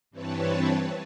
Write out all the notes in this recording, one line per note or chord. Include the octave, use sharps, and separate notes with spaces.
G2 E3 C4 B4 C#5 A5